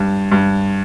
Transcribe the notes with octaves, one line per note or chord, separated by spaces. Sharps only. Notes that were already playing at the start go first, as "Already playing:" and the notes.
Already playing: G2
G2